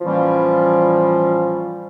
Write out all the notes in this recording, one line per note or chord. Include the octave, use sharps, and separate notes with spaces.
A2 E3 F3 G3 A#3 C#4